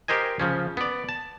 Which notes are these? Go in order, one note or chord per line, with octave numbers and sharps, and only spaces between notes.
G4 A#4 C5 D#5 G#5
C#3 F3 C#4
B3 D5
A5